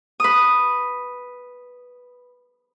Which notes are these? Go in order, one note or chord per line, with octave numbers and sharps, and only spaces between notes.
B4 D#6